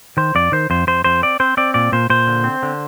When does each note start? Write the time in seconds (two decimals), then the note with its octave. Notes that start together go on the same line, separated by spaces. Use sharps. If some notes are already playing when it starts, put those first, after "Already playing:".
0.17 D#3 C5
0.35 F2 D5
0.52 D#3 C5
0.70 F2 C5
0.87 F2 C5
1.04 F2 C5
1.22 C4 D5
1.40 C4 C5
1.57 C4 D5
1.74 A#2 D5
1.92 A#2 C5
2.10 A#2 C5
2.27 D3
2.44 C4
2.63 D3